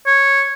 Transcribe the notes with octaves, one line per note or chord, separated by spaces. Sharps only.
C#5